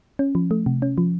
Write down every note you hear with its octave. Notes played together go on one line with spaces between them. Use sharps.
C#4
F3
A3
C3
C#4
F3